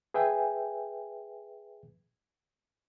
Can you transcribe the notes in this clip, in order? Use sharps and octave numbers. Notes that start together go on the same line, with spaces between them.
G#4 B4 E5 G5 G#5